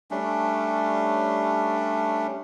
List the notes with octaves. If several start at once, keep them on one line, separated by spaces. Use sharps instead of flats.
G3 A3 C#4 D4